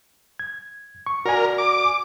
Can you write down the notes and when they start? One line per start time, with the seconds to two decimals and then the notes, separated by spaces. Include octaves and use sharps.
0.39 G#6
1.06 C#6
1.26 F#4 A#4 D5 G#5
1.58 D6